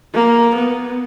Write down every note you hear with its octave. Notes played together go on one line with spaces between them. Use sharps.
A#3
B3